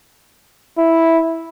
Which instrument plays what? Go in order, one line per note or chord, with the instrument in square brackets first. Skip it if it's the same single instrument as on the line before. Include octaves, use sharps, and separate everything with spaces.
[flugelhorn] E4